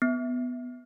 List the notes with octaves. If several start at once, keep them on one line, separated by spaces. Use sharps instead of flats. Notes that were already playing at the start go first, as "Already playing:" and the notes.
B3